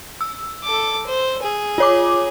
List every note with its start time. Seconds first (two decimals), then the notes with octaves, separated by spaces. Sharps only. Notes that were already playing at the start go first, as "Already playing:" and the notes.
0.21 E6
0.63 A4 D6
1.07 C5
1.43 G#4
1.78 F4 C#5 D6